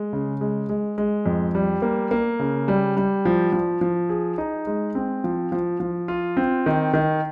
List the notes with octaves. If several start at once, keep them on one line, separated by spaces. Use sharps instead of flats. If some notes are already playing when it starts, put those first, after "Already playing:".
Already playing: G#3
C#3
G#3
G#3
G#3
F2
G3
A#3
A#3
C#3
G3
G3
F3
F3
F3
G#4
D#4
G#3
C4
F3
F3
F3
F4
C4
D#3
D#3